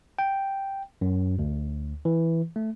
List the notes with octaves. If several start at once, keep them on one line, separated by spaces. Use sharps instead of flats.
G5
F#2
D2
E3
A3